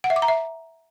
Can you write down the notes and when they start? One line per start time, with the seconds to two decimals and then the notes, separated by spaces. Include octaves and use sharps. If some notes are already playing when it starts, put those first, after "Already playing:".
0.04 F#5
0.10 E5
0.16 D6
0.22 A#5
0.28 E5